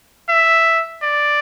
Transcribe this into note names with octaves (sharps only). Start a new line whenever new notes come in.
E5
D5